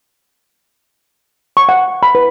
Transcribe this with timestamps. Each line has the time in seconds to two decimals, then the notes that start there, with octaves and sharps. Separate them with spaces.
1.57 C#6
1.69 F#5
2.03 B5
2.15 B4